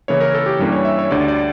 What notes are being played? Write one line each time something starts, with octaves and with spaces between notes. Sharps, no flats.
C#3 E3 A#3 E4 C#5
A#4
A4
G4
G2 E3 G3 A#3 C#4
C#5
E5
C#5
D2 D3 G3 D5
D5